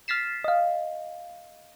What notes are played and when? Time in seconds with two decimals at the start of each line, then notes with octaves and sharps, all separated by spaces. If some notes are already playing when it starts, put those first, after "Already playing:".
0.08 F6 A6 B6 C7 E7
0.44 D#5 F5